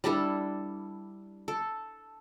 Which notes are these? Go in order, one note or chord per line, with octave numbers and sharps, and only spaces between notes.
G3 D4 E4 A4
A4